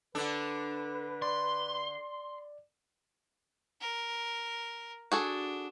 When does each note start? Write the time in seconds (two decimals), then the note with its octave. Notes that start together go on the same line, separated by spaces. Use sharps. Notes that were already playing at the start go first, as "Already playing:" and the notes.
0.15 D3 D4 A4 B4
1.22 D5 C6
3.81 A#4
5.12 D4 F#4 G#4 A4